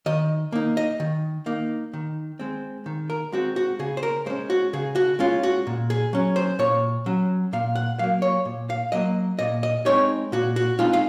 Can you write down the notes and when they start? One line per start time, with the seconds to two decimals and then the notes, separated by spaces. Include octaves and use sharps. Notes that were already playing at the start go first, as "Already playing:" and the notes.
0.06 D#3 D#5
0.52 A#3 D#4
0.77 D#5
1.00 D#3
1.46 A#3 D#4
1.93 D#3
2.39 G#3 C4
2.86 D#3
3.10 A#4
3.32 G#3 C4 F#4
3.56 F#4
3.79 C#3 G#4
3.97 C5
4.03 A#4
4.26 G#3 C#4 C5
4.50 F#4
4.73 C#3 G#4
4.96 F#4
5.19 G#3 C#4 F4
5.43 F#4
5.67 A#2
5.90 G#4
6.13 F#3 C#4
6.36 C5
6.59 A#2 C#5
7.06 F#3 C#4
7.53 A#2 F5
7.75 F#5
7.99 F#3 A#3 F5
8.22 C#5
8.45 A#2
8.70 F5
8.92 F#3 A#3 D#5
9.39 A#2 D#5
9.63 D#5
9.86 G#3 C4 D#4 C#5
10.32 A#2 F#4
10.56 F#4
10.79 G#3 C4 D#4 F4
10.93 F5